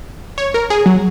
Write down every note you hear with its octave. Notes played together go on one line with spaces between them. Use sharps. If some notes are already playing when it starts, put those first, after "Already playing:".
C#5
A#4
G#4
F#3